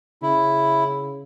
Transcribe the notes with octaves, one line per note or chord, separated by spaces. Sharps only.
C#3 E4